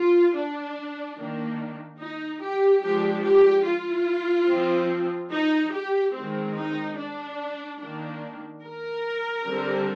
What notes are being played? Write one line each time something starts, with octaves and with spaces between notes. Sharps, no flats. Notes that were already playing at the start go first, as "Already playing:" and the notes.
Already playing: F4
D4
D#3 A#3 D4
D#4
G4
F3 G#3 D4 G4
G4
F4
F3 C4
D#4
G4
D#3 G#3 C4
D#4
D4
D#3 A#3 D4
A#4
D3 G3 C4